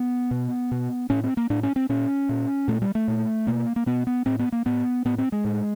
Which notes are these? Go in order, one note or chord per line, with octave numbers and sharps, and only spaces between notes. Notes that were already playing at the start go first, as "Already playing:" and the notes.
Already playing: B3
B2
B2
A2 C#4
C4
A#3
A2 D4
C#4
C4
A#2 C#4
A#2
A#2 A3
G3
A3
A#2
B2 A#3
A#3
B2 B3
B3
A2 C4
B3
A#3
A2 B3
A2 B3
C4
G#3
A2